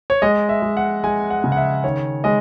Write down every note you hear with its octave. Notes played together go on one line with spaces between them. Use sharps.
C#5
G#3 D#5
E5
G#3
F#5
G#3 G#5
F#5
C#3
F#5
E5
D#3 C#5
G#3 D#5